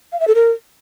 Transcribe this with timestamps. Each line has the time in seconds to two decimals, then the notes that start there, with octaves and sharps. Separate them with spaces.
0.12 F5
0.20 E5
0.28 A4
0.35 A#4